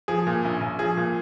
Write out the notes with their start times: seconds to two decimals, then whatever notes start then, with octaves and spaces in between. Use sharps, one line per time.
0.08 F3 G#4
0.27 A#2
0.44 A#1
0.61 A#1
0.79 F3 G#4
0.97 A#2